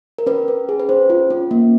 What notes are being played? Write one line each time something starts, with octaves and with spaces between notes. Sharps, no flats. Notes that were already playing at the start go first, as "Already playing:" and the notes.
A#4
C#4 B4
C#4
G#4
B4
C#4 C5
F4
C#4
A#3